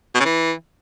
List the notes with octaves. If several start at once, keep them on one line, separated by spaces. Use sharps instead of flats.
B2
C#3
E3